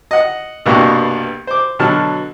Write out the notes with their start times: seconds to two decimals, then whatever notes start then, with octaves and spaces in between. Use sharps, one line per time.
0.11 D#5 F#5
0.66 C2 G2 B2 G3 A#3 B3
1.47 C5 D6
1.79 B2 D3 F#3 A5 F6